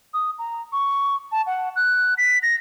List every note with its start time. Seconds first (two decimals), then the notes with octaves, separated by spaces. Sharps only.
0.14 D#6
0.39 A#5
0.73 C#6
1.32 A5
1.47 F#5
1.76 F#6
2.18 B6
2.43 A#6